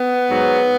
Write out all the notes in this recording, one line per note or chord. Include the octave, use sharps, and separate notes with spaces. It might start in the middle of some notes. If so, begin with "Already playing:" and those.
Already playing: B3
G#2 F#3